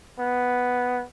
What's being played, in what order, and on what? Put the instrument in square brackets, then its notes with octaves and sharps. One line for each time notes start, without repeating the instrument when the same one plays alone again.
[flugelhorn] B3